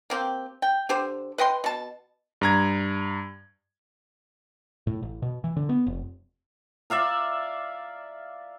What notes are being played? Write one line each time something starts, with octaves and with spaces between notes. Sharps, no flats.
A#3 C4 G4
G5
D3 G4 C5
B4 D#5 G5 C6
B2 A5
G2 A#5 G#6
A2
A1
B2
E3
D3
B3
F1
D5 E5 F5 A#5